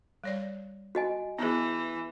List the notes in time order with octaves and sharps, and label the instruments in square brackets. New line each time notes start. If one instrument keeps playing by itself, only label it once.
[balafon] G3 C#5 D5
[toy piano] F#4 D#5 G#5
[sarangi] E3 [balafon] B3 G#4